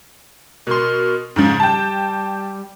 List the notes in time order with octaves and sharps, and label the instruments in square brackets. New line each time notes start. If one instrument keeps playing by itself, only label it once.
[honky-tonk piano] B2 C6 [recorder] A#4
[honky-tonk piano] G#2 C#3 F3 [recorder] C#4
[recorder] G3 [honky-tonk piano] G5 A5